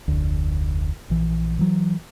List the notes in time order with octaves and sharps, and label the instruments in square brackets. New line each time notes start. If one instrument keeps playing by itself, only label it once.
[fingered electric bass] F1 D2
A#1 E3
E3 F#3